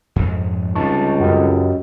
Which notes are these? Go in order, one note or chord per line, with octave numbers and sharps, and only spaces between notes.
F2 G#2
C#2 C3 G3 D#4 A5 C#6
F#2 F#4 G4 D#5